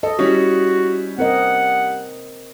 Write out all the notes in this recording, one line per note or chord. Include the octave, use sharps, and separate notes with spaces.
A4 D#5
G3 C#4 E4 F#4
C4 A#4 D#5 F#5